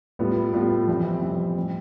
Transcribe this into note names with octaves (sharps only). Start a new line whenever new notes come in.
A2 G3 B3 F4
A2 G3 B3 F4
F2 E3 G3 C4 E4
F2 E3 G3 C4 E4
A2 G3 C4